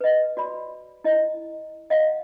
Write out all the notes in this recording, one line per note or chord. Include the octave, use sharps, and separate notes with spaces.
B4 D#5
F#4 D5 B5
E4 D#5
D#5 F5 F#5